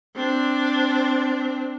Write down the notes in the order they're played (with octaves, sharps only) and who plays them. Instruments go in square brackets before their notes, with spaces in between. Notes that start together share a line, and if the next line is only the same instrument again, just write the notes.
[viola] C4 D4